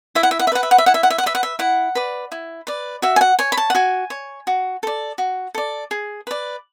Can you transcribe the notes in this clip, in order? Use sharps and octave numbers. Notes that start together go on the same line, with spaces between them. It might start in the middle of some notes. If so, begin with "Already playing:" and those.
E4 E5
F#5
E5
F#5
E5
B4 D5 F#5
E5
F#5
E5
E4 F#5
E5
F#5
E5
F#5
B4 D5 E5
F#5
E5
E4 F#5
B4 D5
E4
B4 D5
F#4 E5
G#5
F#5
C#5 G#5
B5
A5
F#5
F#4 G#5
C#5
F#4
A4 D5
F#4
A4 D5
G#4
B4 D5